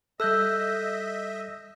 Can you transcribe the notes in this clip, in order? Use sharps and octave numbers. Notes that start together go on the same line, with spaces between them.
G3 A4 D#5 E5 E6 F#6 G6